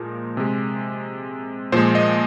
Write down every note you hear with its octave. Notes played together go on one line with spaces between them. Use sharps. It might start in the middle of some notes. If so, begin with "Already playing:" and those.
Already playing: A#2 F3 G#3 A#4
C3 G#3
A#2 F3 G#3 C5
D#5